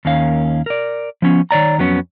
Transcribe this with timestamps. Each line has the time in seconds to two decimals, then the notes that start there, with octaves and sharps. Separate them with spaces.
0.05 D#2 D#3 A#3 C#4 F5
0.66 A#4 D5
1.22 F3 B3 C#4
1.51 D#3 C#5 D5 A#5
1.78 F2 F#3 B3 C#4